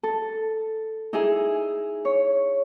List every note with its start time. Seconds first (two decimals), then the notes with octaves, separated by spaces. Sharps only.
0.03 A4
1.13 D#4 E4 G#4
2.05 C#5